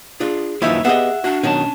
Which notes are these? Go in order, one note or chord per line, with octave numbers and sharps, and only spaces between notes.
D4 F4 G#4
F#2 D#3 F3 A#3 E4 B4 C#5 E5
B3 G4 G#4 D#5 E5 F#5
D4 F#4
B2 D#3 F#3 C#4 A5